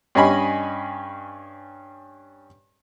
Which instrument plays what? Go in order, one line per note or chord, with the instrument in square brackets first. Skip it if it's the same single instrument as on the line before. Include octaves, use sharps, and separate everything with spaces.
[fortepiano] G2 C#4 D#5 G#5 B5